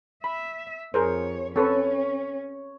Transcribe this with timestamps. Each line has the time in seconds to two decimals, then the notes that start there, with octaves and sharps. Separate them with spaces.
0.24 E5 B5
0.94 F2 G#4 A#4 C5 C#5
1.56 C4 C#4 A4 B4 C#5